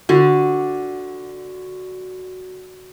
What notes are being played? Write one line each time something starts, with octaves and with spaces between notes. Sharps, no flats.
D3 F#4